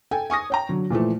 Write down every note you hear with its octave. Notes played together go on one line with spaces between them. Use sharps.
A4 G5 G#5
G#5 C#6 D#6 A#6
C#5 G5 A#5
D3 F#3
A#2 E3 F3 A3